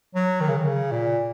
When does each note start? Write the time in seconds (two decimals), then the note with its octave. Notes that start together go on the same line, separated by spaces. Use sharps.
0.15 F#3
0.41 D#3
0.49 C#3
0.57 D#3
0.67 C#3
0.91 A#2